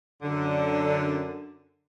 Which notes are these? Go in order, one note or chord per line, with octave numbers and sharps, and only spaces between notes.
F#2 D3